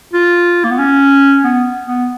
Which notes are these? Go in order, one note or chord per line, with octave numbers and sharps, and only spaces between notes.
F4
A#3
B3
C#4
B3
B3